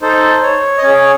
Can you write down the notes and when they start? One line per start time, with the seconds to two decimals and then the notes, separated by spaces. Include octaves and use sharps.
0.01 D#4 A4 C5
0.42 C#5
0.78 D#5
0.83 C#4 G#4 C#5